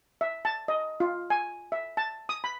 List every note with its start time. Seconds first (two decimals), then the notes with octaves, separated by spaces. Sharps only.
0.21 E5
0.45 A5
0.68 D#5
1.00 F4
1.30 G#5
1.72 E5
1.97 A5
2.29 D#6
2.44 B5